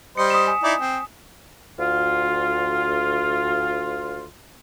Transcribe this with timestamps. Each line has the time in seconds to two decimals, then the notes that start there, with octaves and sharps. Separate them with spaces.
0.17 G3 C5 D#5 C#7
0.30 D#6 B6 E7
0.47 G#5
0.63 D#4 E4 D5
0.80 C4
1.79 D2 F4